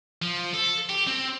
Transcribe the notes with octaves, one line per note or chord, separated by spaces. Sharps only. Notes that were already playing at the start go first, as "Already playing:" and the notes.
F3
A4
G4
C4